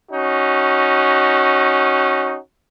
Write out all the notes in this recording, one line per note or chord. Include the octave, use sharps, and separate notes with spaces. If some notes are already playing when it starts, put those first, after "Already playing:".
C#4 D#4 F#4